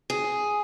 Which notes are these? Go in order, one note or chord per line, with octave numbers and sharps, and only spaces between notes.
G#4